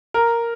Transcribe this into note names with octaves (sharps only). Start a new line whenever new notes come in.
A#4